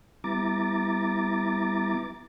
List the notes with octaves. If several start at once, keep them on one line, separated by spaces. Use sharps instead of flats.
G3 B3 E4 A#5 D6 A6